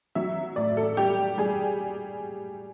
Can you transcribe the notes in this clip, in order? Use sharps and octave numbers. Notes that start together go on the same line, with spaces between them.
F#3 E5
A2 D5
A4
G3 G4
G3 G#4